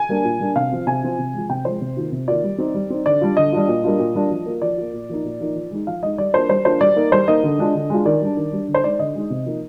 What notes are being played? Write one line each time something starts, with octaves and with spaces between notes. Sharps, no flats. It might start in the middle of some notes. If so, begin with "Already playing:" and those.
Already playing: G#5
G3 A#3 D4
A#2
G3 A#3 D4
C3 F5
F3 C4 F4
C3 G#5
F3 C4 F4
C3
F3 G#3
C3 G5
F3 G#3 C5
C3
D#3 A#3 F4
C3
D#3 A#3 F4 D5
G3
C4 D#4
G3
C4 D#4
D3 D5
G3 D4 F4
D3 D#5
G3 D4 F4
A#2
G3 A#3 D4 F4
A#2
G3 A#3 D4 F4
F3
A#3 F4
F3 D5
A#3 F4
A#2
F3 A#3 D#4
A#2
F3 A#3 D#4
F3
G#3 D#4
F3 F5
G#3 D#4 D#5
G3 D5
A#3 D4 F4 C5
G3 C5
A#3 D4 F4 C5
G3 D5
A#3 D#4
G3 C5
A#3 D#4 D#5
D3
G#3 D4 F4
D3
G#3 D4 F4
D#3 D5
G3 D4
D#3
G3 D4
D3
C5
G#3 D#4 D5
D3 D#5
G#3 D#4
C3
F3 A#3 D#4